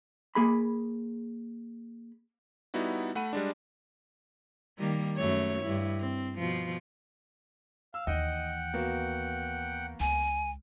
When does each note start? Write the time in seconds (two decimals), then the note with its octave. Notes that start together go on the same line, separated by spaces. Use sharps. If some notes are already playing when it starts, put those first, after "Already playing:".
0.35 A#3 G#4 B5
2.74 G3 B3 D#4 E4 F#4
3.15 A3 F#5 B5 D#7
3.33 G3 G#3 D4
4.78 D#3 G3 A#3
5.16 F#2 A3 C#5
5.62 G2 E4
5.99 C4
6.39 B2 F3
7.94 F5 E6
8.07 D#2 E3 D#5 F#5 G5
8.74 A#3 B3 F#4
10.00 C#2 G#5